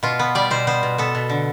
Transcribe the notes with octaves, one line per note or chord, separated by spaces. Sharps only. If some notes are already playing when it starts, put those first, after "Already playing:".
B2 F4
B3
G3 D5
B2 C5
B3 C5
B2
B3 A4
B2
D3